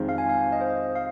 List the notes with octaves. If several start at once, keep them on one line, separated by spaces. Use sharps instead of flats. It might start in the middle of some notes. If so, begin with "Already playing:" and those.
Already playing: F2 D#3 G#3 C4 F4
F5
G#5
F5
D#5
C5
D#5
F5